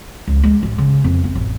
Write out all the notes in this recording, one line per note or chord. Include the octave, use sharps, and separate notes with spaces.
C#2
G#3
A1
C#3
F2
C4
A1